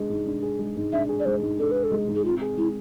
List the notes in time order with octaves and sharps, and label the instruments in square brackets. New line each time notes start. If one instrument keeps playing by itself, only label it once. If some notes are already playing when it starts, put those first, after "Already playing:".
Already playing: [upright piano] G#3 D4 G#4
G#2
D4
G#4
G#3
G#2
[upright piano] D4 [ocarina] E5
[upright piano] G#4
[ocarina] D5
[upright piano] G#3 [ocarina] C5
[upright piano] G#2
[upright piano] D4 [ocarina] A4
[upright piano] G#4 [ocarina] B4
[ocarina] A4
[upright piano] G#3
G#2
[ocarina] G#4
[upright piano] C4 [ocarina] F4
[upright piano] G#4
[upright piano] G#3 [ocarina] E4